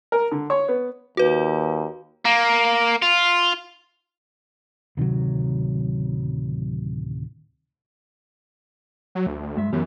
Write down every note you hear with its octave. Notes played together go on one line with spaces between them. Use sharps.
A#4
D3
C#5
B3
D#2 F#4 B4
A#3
F4
D1 C3 D#3 F#3
F#3
D2
G2 G#3 E5
F#2 E3 B3 G4